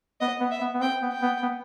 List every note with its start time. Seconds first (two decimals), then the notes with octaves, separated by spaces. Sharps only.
0.21 B3 D#5
0.41 B3
0.51 E5
0.61 B3
0.74 B3
0.81 C4 G5
1.02 B3
1.11 G5
1.22 B3
1.43 B3